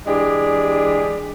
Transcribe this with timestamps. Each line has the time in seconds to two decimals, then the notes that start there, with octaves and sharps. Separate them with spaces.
0.06 E3 G#3 D4 G4 G#4